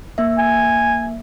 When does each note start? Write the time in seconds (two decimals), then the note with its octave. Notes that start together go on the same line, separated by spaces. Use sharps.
0.18 A#3 E5
0.38 G#5